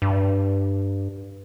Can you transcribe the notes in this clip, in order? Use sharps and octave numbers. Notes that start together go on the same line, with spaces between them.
G2